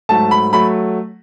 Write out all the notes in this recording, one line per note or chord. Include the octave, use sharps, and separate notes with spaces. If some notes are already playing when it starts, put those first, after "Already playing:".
G#2 F#3 A3 A5
B5
F#3 A3 B5